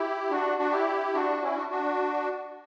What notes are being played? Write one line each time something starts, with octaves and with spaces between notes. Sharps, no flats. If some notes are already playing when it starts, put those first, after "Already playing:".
Already playing: E4 G4
D4 F#4
D4 F#4
E4 G4
D4 F#4
C#4 E4
D4 F#4
D4 F#4